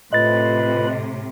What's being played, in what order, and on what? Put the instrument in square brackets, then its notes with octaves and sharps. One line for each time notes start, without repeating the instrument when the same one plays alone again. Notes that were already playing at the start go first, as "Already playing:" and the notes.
[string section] A2 C3 [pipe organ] F4 B4 B5 [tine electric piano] D#5 A6